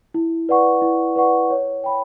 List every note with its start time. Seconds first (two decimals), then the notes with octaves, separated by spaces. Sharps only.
0.14 E4
0.49 B4 D5 F#5 C#6
0.82 E4
1.16 B4 D5 F#5 C#6
1.50 C#5
1.84 G5 B5